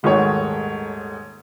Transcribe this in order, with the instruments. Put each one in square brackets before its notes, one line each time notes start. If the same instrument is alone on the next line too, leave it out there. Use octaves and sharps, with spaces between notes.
[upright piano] D#1 G#2 D#3 A3 C#5 F#5